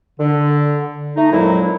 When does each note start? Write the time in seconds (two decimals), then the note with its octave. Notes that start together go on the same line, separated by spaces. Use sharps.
0.20 D3
1.16 A3 D#4
1.31 F2 A#2 F#3 G#3 E4